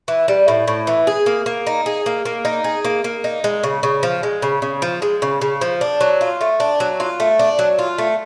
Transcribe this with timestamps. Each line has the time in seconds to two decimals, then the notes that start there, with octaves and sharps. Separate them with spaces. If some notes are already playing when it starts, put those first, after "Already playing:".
0.08 E3
0.28 G3
0.48 A2
0.68 A2
0.87 E3
1.07 G#4
1.26 A#3
1.46 A#3
1.67 D#4
1.86 G#4
2.06 A#3
2.25 A#3
2.45 D#4
2.64 G#4
2.85 A#3
3.04 A#3
3.24 D#4
3.44 G#3
3.63 C#3
3.83 C#3
4.03 F3
4.23 G#3
4.42 C#3
4.62 C#3
4.82 F3
5.02 G#3
5.22 C#3
5.41 C#3
5.61 F3
5.81 D4
6.01 F#3
6.21 F4
6.41 A3
6.60 D4
6.80 F#3
7.00 F4
7.20 A3
7.39 D4
7.59 F#3
7.79 F4
7.98 A3